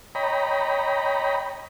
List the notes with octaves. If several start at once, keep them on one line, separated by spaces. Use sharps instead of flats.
C#5 D#5 G5 A#5 B5